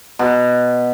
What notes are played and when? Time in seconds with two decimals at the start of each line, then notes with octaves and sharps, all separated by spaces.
0.19 B2